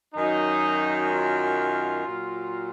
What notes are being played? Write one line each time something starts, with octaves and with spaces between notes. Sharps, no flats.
F#2 D#3 F#3 D#4
F4
A#2 F#3